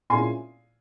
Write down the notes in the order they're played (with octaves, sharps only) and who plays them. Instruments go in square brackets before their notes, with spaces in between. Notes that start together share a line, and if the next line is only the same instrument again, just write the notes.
[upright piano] A#2 G#3 C#4 E4 G#5 C6